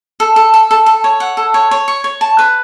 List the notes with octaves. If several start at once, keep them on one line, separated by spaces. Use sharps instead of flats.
A4
A4
A4
A4
A4
C#5
F#5
A4
C#5
C#5
C#6
C#5
A5
B4